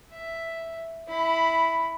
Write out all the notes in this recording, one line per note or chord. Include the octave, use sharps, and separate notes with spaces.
E5
E4 B5